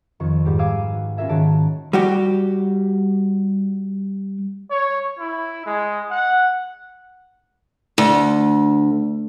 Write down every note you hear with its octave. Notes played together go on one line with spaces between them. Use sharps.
F2 D#3 C#6
G#2 G3 G4 B4
F5 G#5 D6 E6 F6 D#7
F#4
B3 C#4 F4 A#4 E5 G#5
G#2 D#3 F#4 C#5 A5 D7
G3 F#4 G4
C#5
E4
G#3
F#5
D2